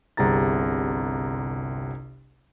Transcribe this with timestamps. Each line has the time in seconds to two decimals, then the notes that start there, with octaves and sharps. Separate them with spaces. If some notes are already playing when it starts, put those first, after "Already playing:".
0.17 G1 C2 C3 G#4 A#5 A6